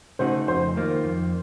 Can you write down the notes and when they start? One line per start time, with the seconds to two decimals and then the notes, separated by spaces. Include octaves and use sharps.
0.19 C#3 A3 D#4 F#4 C5
0.48 F2 C5
0.76 D#3 A#3 F4
1.04 F2